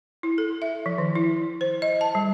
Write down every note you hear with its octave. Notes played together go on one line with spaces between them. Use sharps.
E4
A4
E5
F3
D#3
E4
C5
D#5
A5
G3